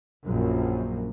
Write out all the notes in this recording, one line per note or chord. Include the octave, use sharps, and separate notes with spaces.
A#1 F#2